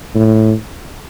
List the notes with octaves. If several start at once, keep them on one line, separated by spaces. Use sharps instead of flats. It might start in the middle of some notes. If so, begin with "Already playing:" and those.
A2